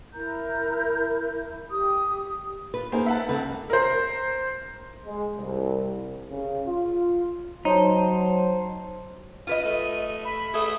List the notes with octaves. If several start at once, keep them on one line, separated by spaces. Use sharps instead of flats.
E4 A#4 A#5 G6
E4
G4 D#6
F4 B4
A#3 D#4 G#4 C5
E5 F#5 A5
C#2 C4 A4 B4
A#4 C5
G#3
C2
C#3
F4
F#3 D#4 C5 C#5 A5
F4 B4 D#5 D#7
A3
B5
A3 G#4 D#6